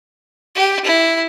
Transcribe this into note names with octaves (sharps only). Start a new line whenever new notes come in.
G4
E4